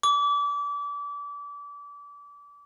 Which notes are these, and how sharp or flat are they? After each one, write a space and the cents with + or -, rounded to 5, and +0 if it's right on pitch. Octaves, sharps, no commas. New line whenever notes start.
D6 -30